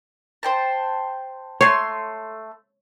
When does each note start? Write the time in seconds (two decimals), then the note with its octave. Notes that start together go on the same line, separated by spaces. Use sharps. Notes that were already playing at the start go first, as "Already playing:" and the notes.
0.43 C5 G5 A5
1.61 A3 C#5 C6